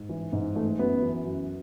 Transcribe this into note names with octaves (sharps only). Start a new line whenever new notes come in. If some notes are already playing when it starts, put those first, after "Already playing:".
Already playing: G#2
E3
G#2
E3 A3
F#2 B3
E3
F#2